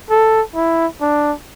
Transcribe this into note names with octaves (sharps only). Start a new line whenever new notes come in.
A4
E4
D4